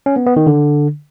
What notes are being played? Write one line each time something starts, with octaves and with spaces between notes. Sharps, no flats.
C#4
B3
B3
D#3
D3